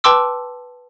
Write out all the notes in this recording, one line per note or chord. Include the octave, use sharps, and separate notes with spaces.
B4 G5 A5 C6 D6 E6